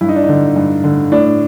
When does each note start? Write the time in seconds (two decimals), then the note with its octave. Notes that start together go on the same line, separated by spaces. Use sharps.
0.01 G2 E4
0.09 D#4
0.16 D4
0.24 D3 D#4
0.56 G2
0.84 D3
1.12 A2 D4